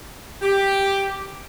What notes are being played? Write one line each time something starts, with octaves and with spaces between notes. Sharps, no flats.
G4